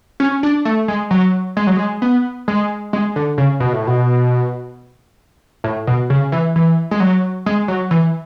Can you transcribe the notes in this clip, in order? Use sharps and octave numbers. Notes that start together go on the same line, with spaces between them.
C#4
D4
A3
G#3
F#3
G#3
F#3
G#3
B3
G#3
G#3
D3
C#3
B2
A2
B2
A2
B2
C#3
E3
E3
G#3
F#3
G#3
F#3
E3